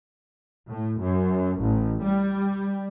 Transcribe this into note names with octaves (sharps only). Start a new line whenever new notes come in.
A2
F#2
A1
G3